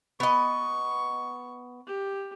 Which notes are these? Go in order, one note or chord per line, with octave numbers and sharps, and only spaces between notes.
B3 D#5 C#6
G4